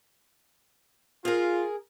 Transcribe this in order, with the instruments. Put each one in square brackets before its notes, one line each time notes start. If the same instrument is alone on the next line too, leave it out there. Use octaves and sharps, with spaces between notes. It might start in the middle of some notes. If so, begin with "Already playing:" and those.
[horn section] F4 [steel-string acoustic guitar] G#4 A#4